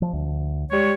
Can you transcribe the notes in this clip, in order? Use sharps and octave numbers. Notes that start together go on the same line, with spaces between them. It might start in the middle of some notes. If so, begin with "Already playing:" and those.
F3
D2
G3 G#3 C#5